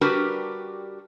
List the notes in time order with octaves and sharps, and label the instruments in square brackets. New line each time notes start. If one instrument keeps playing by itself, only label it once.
[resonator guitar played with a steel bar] G3 D4 F#4 G4 A#4 B4